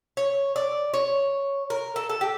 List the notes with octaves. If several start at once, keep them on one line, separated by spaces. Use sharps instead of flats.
C#5
D5
C#5
A#4
A4
A4
G4